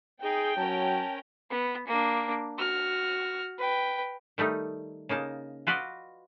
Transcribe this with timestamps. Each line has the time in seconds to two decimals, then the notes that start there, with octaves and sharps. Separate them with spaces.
0.23 D#4 G#4 G5
0.57 F#3 C#4 A#4 A5
1.50 B3
1.87 A#3 D4
2.58 F#4 F6
3.58 B4 G5
4.38 D#3 G3 A3 D#4
5.09 C#3 A#3 D#4 A5
5.67 F4 F#4 B4 D5 D#5